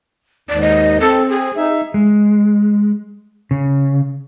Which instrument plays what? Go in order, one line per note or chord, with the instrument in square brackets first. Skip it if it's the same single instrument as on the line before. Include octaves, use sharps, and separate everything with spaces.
[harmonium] D#2 G#2 [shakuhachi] D5
[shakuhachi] D#5
[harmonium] C4 [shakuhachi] A4
[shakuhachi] G#4
[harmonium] D#4 E5
[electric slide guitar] G#3
C#3